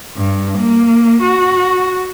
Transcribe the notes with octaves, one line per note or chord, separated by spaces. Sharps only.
G2
A#3
F#4